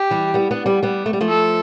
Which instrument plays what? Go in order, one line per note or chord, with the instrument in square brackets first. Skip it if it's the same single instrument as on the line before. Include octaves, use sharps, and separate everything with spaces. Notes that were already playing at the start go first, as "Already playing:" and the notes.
Already playing: [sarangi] G4
[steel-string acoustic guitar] E3 G3
G3 B3
B3 D4
G3 B3
G3 B3
A3
G3
F3 A3
[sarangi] A4